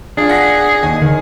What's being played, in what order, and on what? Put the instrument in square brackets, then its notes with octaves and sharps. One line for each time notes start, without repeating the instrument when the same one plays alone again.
[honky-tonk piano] F3 F4 [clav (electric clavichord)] D4 [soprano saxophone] G#4
[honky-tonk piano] F#5 A#6 B6
[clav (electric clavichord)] D#2 [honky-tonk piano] G#5
[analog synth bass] D3 [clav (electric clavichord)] D#3